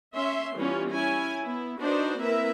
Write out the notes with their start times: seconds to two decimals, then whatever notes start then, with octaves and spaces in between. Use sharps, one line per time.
0.15 C#4 E5 C6
0.56 E3 G3 B3 C#4 F4
0.91 C#4 E4 G#5
1.42 B3 E4
1.80 D4 D#4 F#4 B4 C5 D5
2.19 A#3 C4 E4 A#4 B4 E5